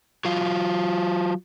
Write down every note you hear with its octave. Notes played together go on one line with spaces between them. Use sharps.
F#3 F4